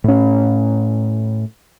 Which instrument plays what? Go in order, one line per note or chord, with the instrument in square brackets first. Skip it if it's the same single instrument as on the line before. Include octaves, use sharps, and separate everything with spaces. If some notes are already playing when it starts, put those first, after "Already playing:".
[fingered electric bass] A2 C#4